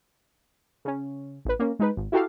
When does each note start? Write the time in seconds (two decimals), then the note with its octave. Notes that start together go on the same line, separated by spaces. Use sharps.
0.85 C#3 C#4
1.45 A1 B4
1.59 A#3 C#4
1.79 G#3 D#4 B4
1.97 G#1
2.12 E4 F#4 G4 A4 F5